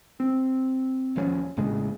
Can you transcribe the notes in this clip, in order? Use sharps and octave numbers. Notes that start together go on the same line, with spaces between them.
C4
D#1 F3 C4 C#4
A#1 A2 C#3 G#3